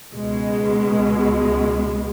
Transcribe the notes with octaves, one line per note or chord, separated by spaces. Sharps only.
C#2 B2 G#3